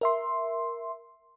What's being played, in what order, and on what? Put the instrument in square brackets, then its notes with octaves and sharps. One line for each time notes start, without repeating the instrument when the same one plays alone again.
[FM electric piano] A#4 E5 C6